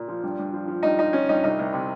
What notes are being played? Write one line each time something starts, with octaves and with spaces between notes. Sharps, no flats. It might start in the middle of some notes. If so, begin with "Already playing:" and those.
Already playing: A#2
F3
G2
G2
F3
F3
G2 D#4
F3 D#4
F3 C#4
G2 D#4
C2 D#4
C2
C3